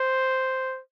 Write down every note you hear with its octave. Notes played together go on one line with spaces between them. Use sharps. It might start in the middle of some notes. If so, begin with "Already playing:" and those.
Already playing: C5